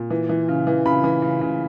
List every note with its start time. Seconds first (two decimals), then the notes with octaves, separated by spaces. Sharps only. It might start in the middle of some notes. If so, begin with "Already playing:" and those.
Already playing: A#2
0.10 E3
0.29 E3
0.48 C#3
0.67 E3
0.86 C#3 B5
1.04 E3
1.22 C#3
1.41 C#3